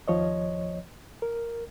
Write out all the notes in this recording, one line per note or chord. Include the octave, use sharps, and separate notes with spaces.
D#2 F3 C#5 D#5
A#4